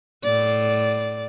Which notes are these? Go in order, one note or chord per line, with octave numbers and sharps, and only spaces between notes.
A2 D5